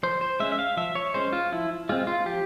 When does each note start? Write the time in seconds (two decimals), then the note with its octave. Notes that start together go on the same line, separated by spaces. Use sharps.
0.03 F3 C5
0.21 C5
0.40 G#3 C#4 E5
0.52 E5
0.59 F5
0.77 F3 E5
0.95 C#5
1.14 G#3 C#4 C5
1.33 F4
1.52 F3 E4
1.89 G#3 C4 F4
2.07 F4
2.26 F3 G4